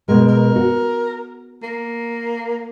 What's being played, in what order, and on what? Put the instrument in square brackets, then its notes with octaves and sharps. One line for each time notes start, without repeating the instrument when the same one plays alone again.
[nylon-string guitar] B2 G#3 [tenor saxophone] A#4
[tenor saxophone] A#4
[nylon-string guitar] F#4
[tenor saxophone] A#3